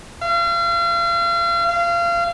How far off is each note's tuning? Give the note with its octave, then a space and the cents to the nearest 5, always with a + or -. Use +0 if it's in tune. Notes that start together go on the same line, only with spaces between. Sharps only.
F5 -40
F5 -30